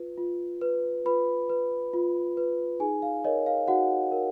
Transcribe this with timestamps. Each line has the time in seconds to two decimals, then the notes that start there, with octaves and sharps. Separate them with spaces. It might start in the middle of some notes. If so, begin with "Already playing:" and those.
Already playing: F4 B4
0.18 F4
0.61 B4
1.05 F4 B4 B5
1.50 B4
1.94 F4
2.37 B4
2.80 D#4 G#4 G#5
3.02 F5
3.24 A#4 C#5 D#5
3.46 F5
3.67 D#4 F#4 F#5
4.12 A#4 C#5